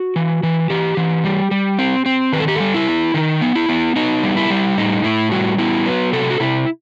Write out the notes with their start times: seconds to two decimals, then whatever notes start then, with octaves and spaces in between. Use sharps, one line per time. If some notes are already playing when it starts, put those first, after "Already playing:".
Already playing: F#4
0.16 E3
0.43 E3
0.70 E3 G4
0.97 E3
1.24 G3
1.51 G3
1.79 C4
2.06 C4
2.33 D#3 B4
2.40 A4
2.48 G4
2.55 G3 A4
2.74 E4
2.87 B3
3.14 D#3 D#4
3.42 B3
3.55 E4
3.69 B3
3.96 B3 D#4
4.23 G3
4.37 E4
4.50 G3
4.77 A2 D#4
5.04 A2 E4
5.32 G3 F#4
5.58 B3 E4
5.86 F#3 B4
6.13 C3 A4
6.30 F#4
6.40 C3 E4